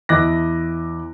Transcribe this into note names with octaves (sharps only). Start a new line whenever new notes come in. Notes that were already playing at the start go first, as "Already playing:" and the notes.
E2 E4 D#5 D6 F#6 A#6